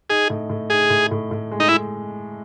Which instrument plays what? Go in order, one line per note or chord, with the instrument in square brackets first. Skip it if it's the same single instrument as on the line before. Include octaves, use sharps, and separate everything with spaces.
[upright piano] D#4 [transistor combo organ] G#4
[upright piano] A2
A2
[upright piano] D#4 [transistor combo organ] G#4
[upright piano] A2
A2
A2
G#3
[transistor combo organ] D#4
E4